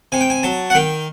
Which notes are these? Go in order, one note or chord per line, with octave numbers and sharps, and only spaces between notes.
C3 G#5
G5
G#5
F#3 A5
F#5
D#3 G5